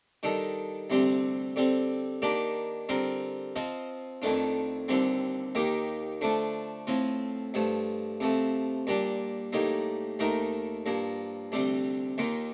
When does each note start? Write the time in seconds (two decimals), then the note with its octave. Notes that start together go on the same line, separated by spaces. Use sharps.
0.23 D#3 G3 D4 A4 D#5
0.90 D2 C3 G3 C4
1.56 D3 G3 C4
2.22 D#3 A#3 D4 G4 D5
2.89 D3 G3 C4 F4 A#4
3.56 F3 C4 F4 C5 D#5
4.22 F2 D#3 A3 D4 F4
4.88 D#2 D3 G3 C4
5.55 D#2 D#3 A#3 D#4 G4
6.21 D3 F3 A3 D4
6.87 A2 F3 C4 F4
7.54 G2 F3 A3
8.20 C3 F3 A3
8.87 A#2 G3 D4
9.53 A2 G3 A#3 D#4
10.19 D#2 D#3 A3 D#4 A#4
10.86 G2 F3 A#3
11.52 D2 C3 G3
12.18 D#2 D#3 A#3 F4